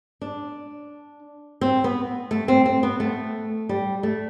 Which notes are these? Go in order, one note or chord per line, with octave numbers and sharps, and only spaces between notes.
D4
C4
B3
A3
C4
C4
B3
A3
G3
A3